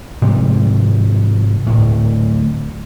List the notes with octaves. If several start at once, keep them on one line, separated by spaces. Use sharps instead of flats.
G#2 C3 F3 G3
D1 A2